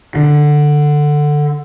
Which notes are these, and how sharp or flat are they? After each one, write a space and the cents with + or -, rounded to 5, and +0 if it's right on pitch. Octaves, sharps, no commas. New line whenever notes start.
D3 +10